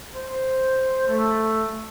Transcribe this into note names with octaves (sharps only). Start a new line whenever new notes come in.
C5
A3